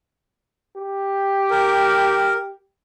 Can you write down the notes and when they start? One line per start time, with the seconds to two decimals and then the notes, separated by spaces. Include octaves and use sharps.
0.77 G4
1.51 A#4